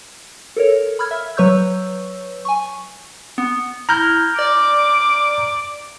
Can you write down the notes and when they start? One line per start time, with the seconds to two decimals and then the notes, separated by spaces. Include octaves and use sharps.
0.56 A4 A#4 C#5
0.99 B5 E6 F6 G#6
1.11 E5
1.37 F#3 B4 C#5 C#6 E6 G6
2.45 G#5 C#6
3.38 B3
3.89 E4 A#5 F6 G6
4.39 D5 D6